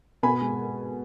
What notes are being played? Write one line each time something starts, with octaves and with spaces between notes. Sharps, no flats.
B2 G#5 B5
G#3